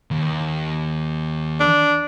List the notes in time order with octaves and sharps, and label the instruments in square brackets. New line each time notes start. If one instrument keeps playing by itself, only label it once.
[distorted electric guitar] D#2
[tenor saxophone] D4